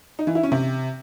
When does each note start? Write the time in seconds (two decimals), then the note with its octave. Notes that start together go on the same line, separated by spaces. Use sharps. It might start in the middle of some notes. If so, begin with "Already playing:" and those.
0.19 D#4
0.27 E3
0.35 E4
0.43 C#4
0.52 C3